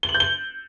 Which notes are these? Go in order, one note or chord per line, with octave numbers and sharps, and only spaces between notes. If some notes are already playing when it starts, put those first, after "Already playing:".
G7
F#7
G6
G7